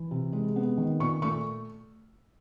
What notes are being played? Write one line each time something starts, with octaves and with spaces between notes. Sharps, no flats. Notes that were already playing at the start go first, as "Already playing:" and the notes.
Already playing: E3
C3
G#3
B3
D#3
A#2 C#6
A3 C#6